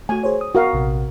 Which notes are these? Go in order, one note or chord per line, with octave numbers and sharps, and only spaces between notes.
A3 F#4 G#5
G#4 C5 C#5
D#6
F#4 A#4 F5
A#1 C3